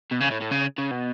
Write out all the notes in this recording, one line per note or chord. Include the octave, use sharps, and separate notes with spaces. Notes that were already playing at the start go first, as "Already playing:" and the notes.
B2
C#3
A2
A2
C#3
C#3
B2